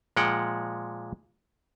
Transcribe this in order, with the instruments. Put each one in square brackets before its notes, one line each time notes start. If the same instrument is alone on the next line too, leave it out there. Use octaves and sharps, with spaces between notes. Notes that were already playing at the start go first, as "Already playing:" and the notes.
[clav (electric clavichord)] A#2 F3 G#3 F#5 G5